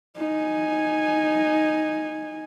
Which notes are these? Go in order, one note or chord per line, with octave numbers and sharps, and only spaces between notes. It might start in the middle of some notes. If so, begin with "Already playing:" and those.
D#4 G#5